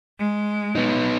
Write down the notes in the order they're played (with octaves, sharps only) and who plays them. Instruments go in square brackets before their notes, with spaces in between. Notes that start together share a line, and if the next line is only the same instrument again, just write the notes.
[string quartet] G#3
[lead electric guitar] B3 D#4